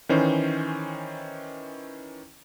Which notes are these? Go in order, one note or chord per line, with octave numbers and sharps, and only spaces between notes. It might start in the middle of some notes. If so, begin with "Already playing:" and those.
D#3 E3 C#4 C5